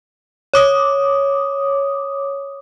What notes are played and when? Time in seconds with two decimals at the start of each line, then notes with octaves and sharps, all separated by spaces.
0.54 C#5 D6 D#6